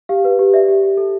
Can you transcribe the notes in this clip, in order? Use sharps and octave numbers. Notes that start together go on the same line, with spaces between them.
G4 F5
B4
G4
D5 E5
G4
G4
A4